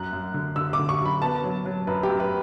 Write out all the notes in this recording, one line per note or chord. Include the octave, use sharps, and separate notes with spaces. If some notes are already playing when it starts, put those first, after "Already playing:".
Already playing: F#2 F#6
F#2
D3
D3 E6
D6
D3
C#6
F#2
B5
B3 A5
F#3
F#3
F#2 B4
G4
F#2
B4